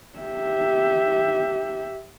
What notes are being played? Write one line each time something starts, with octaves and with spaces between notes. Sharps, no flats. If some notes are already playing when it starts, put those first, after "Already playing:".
G4 E5